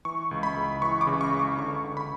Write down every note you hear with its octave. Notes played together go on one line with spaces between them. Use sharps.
E3 C#6
C#2
B5
C#2
E3 C#6
D6
C#3
C#6
C#2
D6
D3 C#6
D3
B5